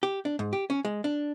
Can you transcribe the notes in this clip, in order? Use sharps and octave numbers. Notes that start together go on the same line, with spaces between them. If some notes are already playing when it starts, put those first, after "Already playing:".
G4
D4
G#2
G4
C#4
G#3
D4